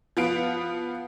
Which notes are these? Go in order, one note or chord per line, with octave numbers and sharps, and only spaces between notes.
F3 B3 F4 D7